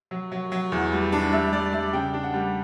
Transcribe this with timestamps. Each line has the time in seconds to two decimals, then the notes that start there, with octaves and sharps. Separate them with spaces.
0.11 F#3
0.32 F#3
0.52 F#3
0.72 E2
0.92 G3
1.12 D4
1.32 G3 E5
1.52 G3 D5
1.73 G3 E5
1.93 C#3 G5
2.14 D4
2.23 F#5
2.34 G3